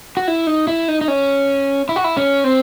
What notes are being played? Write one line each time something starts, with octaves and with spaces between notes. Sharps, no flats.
F#4
E4
D#4
E4
D#4
D#4
C#4
E4
F#4
E4
C#4
C4